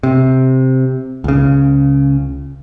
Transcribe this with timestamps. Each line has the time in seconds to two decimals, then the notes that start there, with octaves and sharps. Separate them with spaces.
0.03 C3
1.24 C#2 C#3